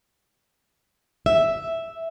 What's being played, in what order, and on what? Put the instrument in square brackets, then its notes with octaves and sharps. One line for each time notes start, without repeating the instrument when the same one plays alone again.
[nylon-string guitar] E5